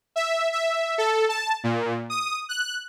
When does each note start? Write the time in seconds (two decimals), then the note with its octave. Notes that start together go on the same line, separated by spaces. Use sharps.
0.16 E5
0.52 E5
0.98 A4
1.29 A5
1.64 A#2
2.10 D#6
2.49 F#6